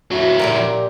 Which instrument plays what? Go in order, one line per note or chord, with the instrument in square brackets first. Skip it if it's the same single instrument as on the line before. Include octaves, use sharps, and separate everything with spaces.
[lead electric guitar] F#3 E4 [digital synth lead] F#4
[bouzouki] A#2 G4 A#4 [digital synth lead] A#5